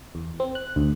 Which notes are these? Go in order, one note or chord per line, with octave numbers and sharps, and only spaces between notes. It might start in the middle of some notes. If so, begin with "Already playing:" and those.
E2
C4
F#6
D2